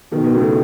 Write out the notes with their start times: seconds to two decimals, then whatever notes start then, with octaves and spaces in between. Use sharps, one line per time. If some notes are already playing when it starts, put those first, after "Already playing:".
0.11 B2 D#3
0.24 B2
0.34 A2 C#3